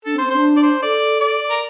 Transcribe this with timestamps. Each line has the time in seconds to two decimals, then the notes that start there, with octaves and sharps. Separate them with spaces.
0.05 D4 A4
0.14 C4
0.18 C5
0.25 C4
0.31 D4 C5
0.56 D5
0.63 C5
0.82 A4 D5
1.21 D5
1.50 A#4